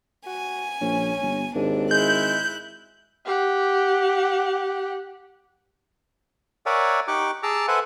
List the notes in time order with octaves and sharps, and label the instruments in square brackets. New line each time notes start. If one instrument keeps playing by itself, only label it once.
[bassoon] F#4 [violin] G#5
[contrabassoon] A#1 [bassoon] C#4
[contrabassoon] G1
[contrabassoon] G#1 [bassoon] D#2 [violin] D4
[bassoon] G#3 [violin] E4 F#6 [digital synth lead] G6
[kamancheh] G4 F#5
[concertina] A#4 C#5 D5 E5 F#5 G#5
D#4 G4 C#6 D6 F#6
G#4 A5 A#5 D6 E6
A4 B4 C5 E5 F#5 G#5